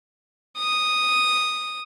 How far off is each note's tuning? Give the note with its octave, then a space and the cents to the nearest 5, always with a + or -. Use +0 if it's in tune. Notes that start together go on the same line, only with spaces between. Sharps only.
D#6 -5